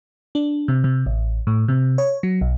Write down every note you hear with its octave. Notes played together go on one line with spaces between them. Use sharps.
D4
C3
C3
A1
A2
C3
C#5
F#3
B1